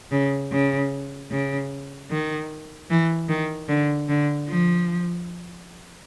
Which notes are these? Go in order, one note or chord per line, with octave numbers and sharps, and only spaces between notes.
C#3
C#3
C#3
D#3
E3
D#3
D3
D3
F3